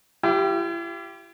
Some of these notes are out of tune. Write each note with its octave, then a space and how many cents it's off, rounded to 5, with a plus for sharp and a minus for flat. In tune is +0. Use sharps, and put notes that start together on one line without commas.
E4 +45 G4 -10